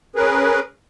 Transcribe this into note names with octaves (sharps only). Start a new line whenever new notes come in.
C#4 G#4 A#4 B4